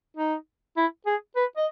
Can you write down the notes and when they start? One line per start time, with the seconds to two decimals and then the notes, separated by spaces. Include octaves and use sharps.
0.17 D#4
0.77 E4
1.06 G#4
1.36 B4
1.57 D#5